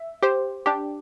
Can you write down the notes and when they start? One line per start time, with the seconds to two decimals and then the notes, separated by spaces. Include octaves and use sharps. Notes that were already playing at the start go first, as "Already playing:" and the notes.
Already playing: E5
0.23 G4 C5
0.66 D4 G4